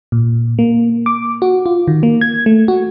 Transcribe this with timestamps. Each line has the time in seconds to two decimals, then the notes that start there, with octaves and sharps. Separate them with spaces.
0.12 A#2
0.59 A#3
1.06 D6
1.42 F#4
1.66 F4
1.88 D#3
2.03 A#3
2.21 G#6
2.46 A3
2.68 F#4